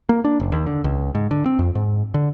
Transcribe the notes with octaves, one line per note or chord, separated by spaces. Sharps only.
A#3
D4
F#1
D#2
D3
C#2
G#2
D3
C4
F2
G#2
D3